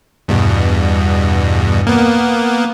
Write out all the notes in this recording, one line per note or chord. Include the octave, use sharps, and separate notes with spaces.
E2 G2 B2
A#3 B3